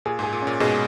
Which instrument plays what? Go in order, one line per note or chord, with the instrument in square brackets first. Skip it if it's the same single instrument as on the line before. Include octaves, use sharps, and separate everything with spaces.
[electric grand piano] A#2 [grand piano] G#4
[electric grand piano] G#2 [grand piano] G#4
[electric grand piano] A#2
[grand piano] C#4
[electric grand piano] A#2
[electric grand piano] G#2 B2 [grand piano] G#3